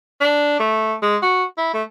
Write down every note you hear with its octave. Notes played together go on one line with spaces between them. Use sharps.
D4
A3
G#3
F#4
E4
A3